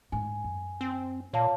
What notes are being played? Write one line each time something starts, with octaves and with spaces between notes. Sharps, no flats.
G#2 G#5
F#2
C4
A#2 C#5 F5 A5